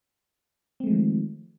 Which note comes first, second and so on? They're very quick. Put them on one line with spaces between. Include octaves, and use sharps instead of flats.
C4 A3 G#3 F3 D#3